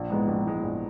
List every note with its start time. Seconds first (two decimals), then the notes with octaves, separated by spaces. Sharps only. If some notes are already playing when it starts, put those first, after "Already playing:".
Already playing: A#1
0.10 G#2 E3 G#3 B3
0.28 A#1
0.45 G#2 E3 G#3 B3
0.62 A#1